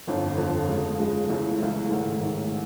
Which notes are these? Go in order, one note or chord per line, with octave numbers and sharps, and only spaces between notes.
G1 F2 D3
G1 F2 D3
C#3 F3 G#3
C#3 F3 G#3
C#2 C#3 E3 A3
C#2 C#3 E3 A3
A1 G#2 D#3
A1 G#2 D#3